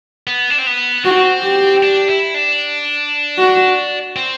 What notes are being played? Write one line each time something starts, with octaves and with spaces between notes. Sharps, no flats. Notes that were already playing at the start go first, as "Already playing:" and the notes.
B3
D4
C4
B3
C4 F#4
G4
D4
E4
D4
F#4
C4